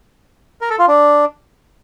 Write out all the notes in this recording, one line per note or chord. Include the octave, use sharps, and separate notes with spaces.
A#4
A4
F4
D4